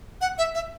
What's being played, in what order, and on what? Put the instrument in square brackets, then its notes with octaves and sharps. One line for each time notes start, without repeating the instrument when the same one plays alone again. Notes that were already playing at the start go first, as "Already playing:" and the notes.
[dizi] F#5
E5
E5